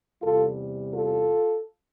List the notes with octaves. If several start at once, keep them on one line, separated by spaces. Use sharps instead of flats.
E2 C3 G3 F4 A4
F4 A4